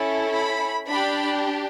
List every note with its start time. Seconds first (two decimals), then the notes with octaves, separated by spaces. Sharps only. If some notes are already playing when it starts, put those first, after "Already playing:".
Already playing: C#4 E4 A4
0.34 B5
0.87 D4 G4 B5